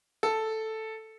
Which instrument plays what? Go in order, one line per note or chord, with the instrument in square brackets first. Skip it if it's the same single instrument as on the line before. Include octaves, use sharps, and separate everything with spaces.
[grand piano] A4